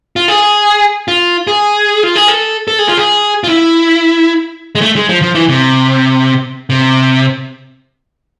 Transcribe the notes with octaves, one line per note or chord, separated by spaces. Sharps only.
F4
G#4
F4
G#4
F4
G#4
A4
A4
G#4
F4
G#4
F4
E4
G#3
A3
G#3
F3
F3
E3
C3
C3